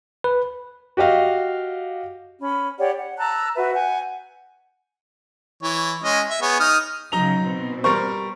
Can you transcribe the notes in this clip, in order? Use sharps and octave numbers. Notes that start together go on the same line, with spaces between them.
B4
F#4 G4 D#5 F5
C#4 B5
G4 C#5 D5 F#5
F#5
A5 A#5 E6 F#6
F#4 B4 E5
F#5 G#5 G6
E3 C#5
G#3 C#4 D#5
E5
B3 G#4 C#5
D#4 D#6 F6
C#3 F#3 D#4 A#5 F7
B2 C4
G3 A#4 C5 C#6